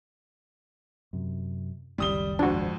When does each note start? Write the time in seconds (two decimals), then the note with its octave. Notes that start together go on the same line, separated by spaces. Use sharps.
1.13 F#2 C3
1.98 F#1 C#2 D#3 G3 D#6 G7
2.39 F2 G#2 D4 F#4